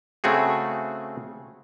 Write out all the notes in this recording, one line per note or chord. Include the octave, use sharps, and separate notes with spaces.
C#3 A3 C4 F#4 G#4